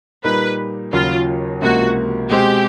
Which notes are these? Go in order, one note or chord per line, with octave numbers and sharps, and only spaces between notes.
A#2 G3 A#3 D#4 B4
D#2 C#3 F#3 F4
C#2 C3 F3 A#3 F#4
B2 G#3 C4 G4